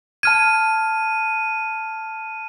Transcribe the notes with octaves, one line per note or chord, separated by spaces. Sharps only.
A5 F6 G#6 D#7